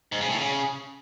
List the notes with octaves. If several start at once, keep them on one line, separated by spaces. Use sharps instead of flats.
G#2
C#3
A2
C#3